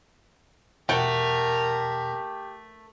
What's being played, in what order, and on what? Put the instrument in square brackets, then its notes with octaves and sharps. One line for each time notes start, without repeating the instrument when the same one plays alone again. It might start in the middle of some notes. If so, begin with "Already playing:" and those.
[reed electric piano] E2 B2 F#5 [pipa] A3 G5 [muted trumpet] G4 [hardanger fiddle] A#4